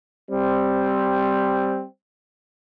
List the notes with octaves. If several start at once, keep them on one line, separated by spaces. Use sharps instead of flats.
G3 C4